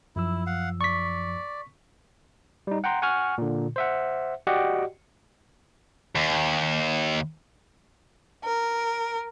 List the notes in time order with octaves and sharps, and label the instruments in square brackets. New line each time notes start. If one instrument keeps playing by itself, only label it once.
[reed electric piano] F#2 F3 E6 [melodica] E4
[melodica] F5 F#5
[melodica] D5 [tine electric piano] C#6 B6
[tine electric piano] G3 D#4
F#5 G5 A#5 C6
F#5 G#5 C#6 F6
A#2 D3
C5 E5 F#5
F#4 G4 D5 D#5 F#5 G5
[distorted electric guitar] D#2
[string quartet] A#4